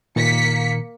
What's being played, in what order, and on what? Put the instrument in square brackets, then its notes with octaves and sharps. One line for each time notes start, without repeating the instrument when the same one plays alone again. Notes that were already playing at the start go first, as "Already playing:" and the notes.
[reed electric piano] A#2 D#3 [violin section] A#3 B6 C#7